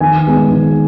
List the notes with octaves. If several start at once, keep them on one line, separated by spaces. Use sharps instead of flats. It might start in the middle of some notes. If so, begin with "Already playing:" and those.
D#3 G#5
G#3 B3
D#3